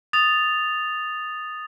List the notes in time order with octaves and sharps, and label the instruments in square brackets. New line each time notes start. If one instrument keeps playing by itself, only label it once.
[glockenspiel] D#6 A6 F7